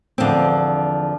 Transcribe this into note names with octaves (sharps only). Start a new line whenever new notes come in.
E2 D3 F3 C4